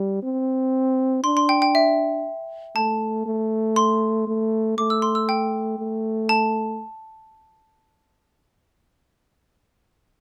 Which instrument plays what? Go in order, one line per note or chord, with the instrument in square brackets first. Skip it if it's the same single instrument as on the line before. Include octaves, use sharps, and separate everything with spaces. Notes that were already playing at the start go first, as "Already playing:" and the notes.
Already playing: [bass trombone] G3
C4
[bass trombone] D4 [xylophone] C6
[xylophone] C6
G5
G5
E5
[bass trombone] A3 [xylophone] A5
[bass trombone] A3
[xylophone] C6
[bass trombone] A3
[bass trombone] A3 [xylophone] D6
[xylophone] E6
C6
E6
G5
[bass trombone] A3
[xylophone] A5